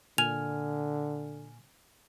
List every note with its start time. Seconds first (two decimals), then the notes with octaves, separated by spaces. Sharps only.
0.18 A#2 D3 G#5 F6 F7